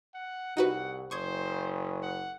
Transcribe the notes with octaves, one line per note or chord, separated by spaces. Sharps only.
F#5
C2 D#4 F#4 B4 F#5
F#1 C5 C#6 D#6 G#6
F#5